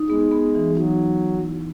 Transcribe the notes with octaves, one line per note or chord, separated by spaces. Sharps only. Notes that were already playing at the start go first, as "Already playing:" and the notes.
Already playing: D#4
G#3 B3
B3
E3
F#3 D#4
D#4
E3
E4